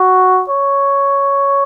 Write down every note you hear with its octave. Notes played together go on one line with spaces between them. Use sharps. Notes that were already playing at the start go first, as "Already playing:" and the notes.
Already playing: F#4
C#5